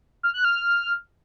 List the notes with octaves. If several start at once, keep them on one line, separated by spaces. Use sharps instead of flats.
F6
F#6
F6